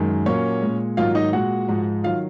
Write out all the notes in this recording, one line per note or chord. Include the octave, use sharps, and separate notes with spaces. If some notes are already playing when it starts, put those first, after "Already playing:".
Already playing: F#2 D#3 G#3
A#2 F#3 A#3 C#4 C#5
A#2 G#3
G#2 D#3 F#3 A#3 F4 F5
D#4 D#5
A#2 G#3 F#4 F#5
G#2 F3 G#3
D#3 F#3 F4 F5